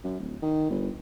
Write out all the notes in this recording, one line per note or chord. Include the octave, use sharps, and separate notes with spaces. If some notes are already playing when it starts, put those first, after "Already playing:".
F#2
D1
D#3
G1